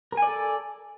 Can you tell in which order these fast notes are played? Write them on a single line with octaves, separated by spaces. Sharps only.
A#4 G#5 D5 A4